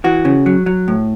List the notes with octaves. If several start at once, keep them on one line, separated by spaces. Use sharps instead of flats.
E3 F#4
C#3
F#3
F#3
A2